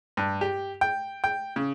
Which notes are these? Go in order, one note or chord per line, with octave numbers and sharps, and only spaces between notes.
G2
G4
G5
G5
C#3